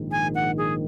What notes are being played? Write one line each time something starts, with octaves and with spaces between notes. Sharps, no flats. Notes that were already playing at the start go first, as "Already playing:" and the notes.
Already playing: A#1 G#2 D#3
G#5
F#5
G#4